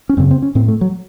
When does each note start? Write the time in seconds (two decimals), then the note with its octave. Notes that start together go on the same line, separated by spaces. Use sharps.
0.09 C#4
0.17 F#2 C#3 C4
0.31 C4
0.42 C#4
0.55 A2 C4
0.68 A3
0.81 F#3